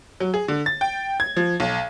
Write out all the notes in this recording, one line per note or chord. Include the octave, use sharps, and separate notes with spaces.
F#3
G#4
D3
A6
G5
G#6
F3
B1